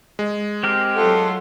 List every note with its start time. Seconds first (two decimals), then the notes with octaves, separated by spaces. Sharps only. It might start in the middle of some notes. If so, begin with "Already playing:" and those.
0.19 G#3
0.63 C4 G4 A#4
0.96 F#3 A3 F4 A4 F#5